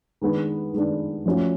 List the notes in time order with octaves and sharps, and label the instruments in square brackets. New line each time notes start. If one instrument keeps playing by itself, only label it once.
[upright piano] D#3 G#3 B3 D4
D#3 G#3 B3 D4
F3 A3 C#4 F#4